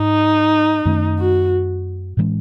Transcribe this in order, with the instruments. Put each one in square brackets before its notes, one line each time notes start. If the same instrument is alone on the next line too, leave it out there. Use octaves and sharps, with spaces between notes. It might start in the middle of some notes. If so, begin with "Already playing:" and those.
Already playing: [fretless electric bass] G#2 [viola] D#4
[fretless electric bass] F#2 D#3 A3 C#4
[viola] F#4
[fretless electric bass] A2 E3 G#3 C#4